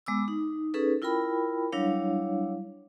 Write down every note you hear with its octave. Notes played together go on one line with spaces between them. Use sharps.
G#3 B3 D6 E6
D#4
C#4 D#4 G#4 A4 B4
E4 F4 A#4 G5 B5
F#3 G3 D4 E4 C#5 F5